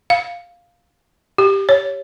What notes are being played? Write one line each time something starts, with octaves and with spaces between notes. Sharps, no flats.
F5
G4
C#5